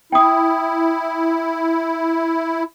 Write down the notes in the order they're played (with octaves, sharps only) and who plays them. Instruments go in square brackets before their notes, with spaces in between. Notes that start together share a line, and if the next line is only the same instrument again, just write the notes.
[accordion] E4 [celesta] G5 D#6